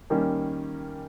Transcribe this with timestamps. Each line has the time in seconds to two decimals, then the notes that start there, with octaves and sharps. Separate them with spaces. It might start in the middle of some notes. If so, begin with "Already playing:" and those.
0.10 D#3 G3 A#3 C#4